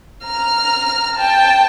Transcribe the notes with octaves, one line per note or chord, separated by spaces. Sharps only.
A#5 F6
G5 A5